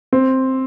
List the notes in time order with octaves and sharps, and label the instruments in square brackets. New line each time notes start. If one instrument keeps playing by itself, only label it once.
[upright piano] C4